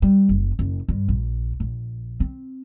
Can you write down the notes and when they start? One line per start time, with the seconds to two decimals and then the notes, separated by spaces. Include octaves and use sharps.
0.02 G3
0.29 F#1
0.59 F#1
0.88 G2
1.08 A#1
1.60 A#1
2.20 C4